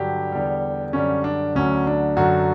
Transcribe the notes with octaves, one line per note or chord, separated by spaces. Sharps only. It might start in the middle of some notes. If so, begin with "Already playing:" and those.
Already playing: G2 D3 F#3 G4
E2 D3 G3
F#2 D3 G3 C#4
D4
D2 D3 F#3 C#4
D4
F#2 D3 F#3 F#4